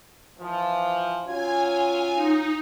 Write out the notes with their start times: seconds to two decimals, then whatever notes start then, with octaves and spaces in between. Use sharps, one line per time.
0.39 E3 F3
1.25 F#3 C#4 F4 G#5
2.15 D#4